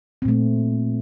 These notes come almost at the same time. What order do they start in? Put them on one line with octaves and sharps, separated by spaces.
C4 A#2 A3